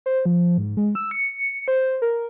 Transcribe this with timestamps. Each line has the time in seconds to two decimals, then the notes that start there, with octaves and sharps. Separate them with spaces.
0.06 C5
0.25 F3
0.58 G#2
0.77 G#3
0.95 E6
1.11 C#7
1.68 C5
2.02 A#4